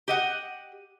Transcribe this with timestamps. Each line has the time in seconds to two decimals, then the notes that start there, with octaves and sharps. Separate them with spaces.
0.08 G4 D#5 F#5